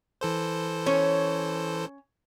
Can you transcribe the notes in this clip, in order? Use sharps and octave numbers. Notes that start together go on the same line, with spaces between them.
E3 A4 C5
C#4 C#5